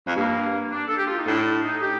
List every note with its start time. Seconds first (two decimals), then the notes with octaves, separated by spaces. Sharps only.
0.07 F2
0.16 G2 A#3
0.71 D4
0.88 A4
0.97 G4
1.07 F4
1.17 D#4
1.27 A2 D4
1.64 D#4
1.82 G4